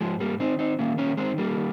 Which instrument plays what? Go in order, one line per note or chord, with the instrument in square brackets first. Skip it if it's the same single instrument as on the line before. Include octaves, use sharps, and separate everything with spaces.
[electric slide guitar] G#2 F3 G#3
G3 A#3
D#3 C4 D#4
C4 D#4
D#3 A#3 C#4
A#3 C#4
D#3 G#3 C4
G3 A#3
D#3